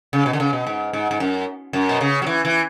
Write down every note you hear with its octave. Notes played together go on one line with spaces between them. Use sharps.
C#3
B2
D3
C#3
B2
G#2
G#2
G#2
F#2
F#2
B2
C#3
F#3
E3
E3